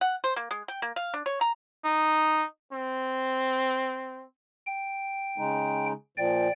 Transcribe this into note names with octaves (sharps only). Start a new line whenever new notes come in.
F#5
C5
A#3
G#3
G5
A#3
F5
D4
C#5
A#5
D#4
C4
G5
C#3 G#3 D#4
A#2 F3 D5 G5